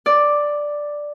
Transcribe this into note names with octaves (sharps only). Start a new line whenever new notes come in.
D5